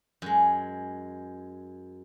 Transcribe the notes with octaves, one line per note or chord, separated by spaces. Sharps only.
F#2 G#3